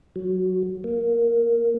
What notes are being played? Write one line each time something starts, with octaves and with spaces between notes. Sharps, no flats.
F#3
A#3